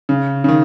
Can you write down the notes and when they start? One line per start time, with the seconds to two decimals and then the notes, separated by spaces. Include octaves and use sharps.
0.09 C#3
0.44 C#3
0.49 D#3